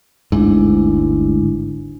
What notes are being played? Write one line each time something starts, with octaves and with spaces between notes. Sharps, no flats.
G1 D2 G#2 G#3 D4 E4